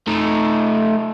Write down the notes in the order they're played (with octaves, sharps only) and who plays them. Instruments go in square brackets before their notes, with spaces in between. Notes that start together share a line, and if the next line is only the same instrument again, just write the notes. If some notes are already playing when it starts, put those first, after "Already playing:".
[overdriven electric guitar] A3 D#4